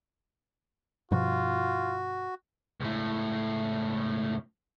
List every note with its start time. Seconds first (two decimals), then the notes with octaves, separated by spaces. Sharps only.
1.12 G2 B2 F3 F4 F#4
2.80 C#2 A2